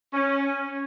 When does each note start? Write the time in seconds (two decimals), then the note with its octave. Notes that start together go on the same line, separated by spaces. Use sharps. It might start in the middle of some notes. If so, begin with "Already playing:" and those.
0.13 C#4